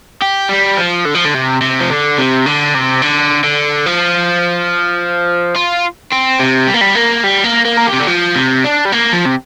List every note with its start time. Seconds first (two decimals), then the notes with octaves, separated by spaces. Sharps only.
0.22 G4
0.49 G3
0.77 F3
1.06 D3
1.15 F3
1.25 D3
1.34 C3
1.62 C3
1.80 F3
1.90 D3
2.18 C3
2.46 D3
2.75 C3
3.02 D3
3.44 D3
3.86 F3
5.56 F4
6.12 C4
6.40 C3
6.68 G3
6.74 A#3
6.81 G3
6.95 A#3
7.24 G3
7.44 A#3
7.65 A#3
7.78 A#4
7.87 G4
7.93 C3
8.00 D3
8.08 F3
8.35 C3
8.64 D4
8.85 G3
8.92 A#3
9.13 F3
9.26 C3